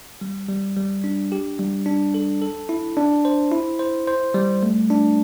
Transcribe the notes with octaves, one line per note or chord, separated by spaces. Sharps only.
G3
G3
G3
D4
G4
G3
D4
A4
A4
E4
D4
C5
E4
C5
C5
G3
A3
D4